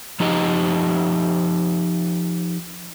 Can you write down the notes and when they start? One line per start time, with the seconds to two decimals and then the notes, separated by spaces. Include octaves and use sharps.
0.20 F3 D#4 G4 D#5